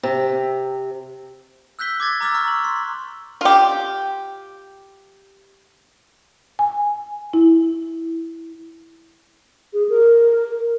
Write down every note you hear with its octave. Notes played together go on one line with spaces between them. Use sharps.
C3
E6 F#6 G6 B6 G7
D6 G#6 A6
A#5 D6 E6 F6 A6
A#5 C#6 F6
F#7
C6
F4 G4
G#5
E4
G#4
A#4